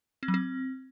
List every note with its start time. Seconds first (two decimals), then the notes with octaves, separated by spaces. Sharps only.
0.23 C4
0.28 F#3
0.34 C4